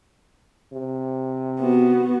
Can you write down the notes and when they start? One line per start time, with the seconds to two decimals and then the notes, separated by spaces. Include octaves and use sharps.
0.73 C3
1.60 B3 F#4